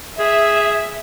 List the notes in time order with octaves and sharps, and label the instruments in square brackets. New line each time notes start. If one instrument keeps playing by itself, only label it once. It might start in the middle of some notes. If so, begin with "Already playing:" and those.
[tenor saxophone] G#4 [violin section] E5